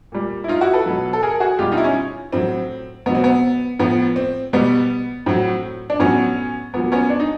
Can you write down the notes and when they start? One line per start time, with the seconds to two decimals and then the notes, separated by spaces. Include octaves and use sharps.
0.12 A#2 G3
0.44 E4
0.48 D#4 F4
0.61 E4 F#4
0.73 A4 B4
0.86 B2 F#3
1.13 A4
1.23 G#4 A#4
1.40 F#4 G#4
1.59 B2 G3 F4 G4
1.72 D#4 F4
1.77 E4
1.84 C#4 D#4
2.32 A2 F#3 C4
3.06 B2 F#3 B3
3.15 C4
3.24 B3
3.79 A2 F3 B3
4.16 C4
4.53 B2 G3 B3
5.26 A2 F#3 C4
5.90 D4
5.99 A2 F#3 B3 C#4
6.74 A#2 F#3 B3
6.92 B3 C#4
7.10 D4
7.20 D#4